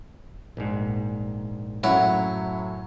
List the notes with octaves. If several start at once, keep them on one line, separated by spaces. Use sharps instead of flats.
A#1 G#2
F#2 A2 F#3 E4 C#5 F#5